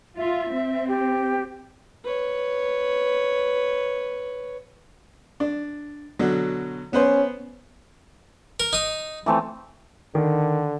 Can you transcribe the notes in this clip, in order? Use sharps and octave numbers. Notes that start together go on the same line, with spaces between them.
F4 E5
C4
G4
B4 C#5
D4
B2 D3 F#3
B3 C#4 B4 C5
A#4
D#4 D#6
E3 A3 C4
D3 D#3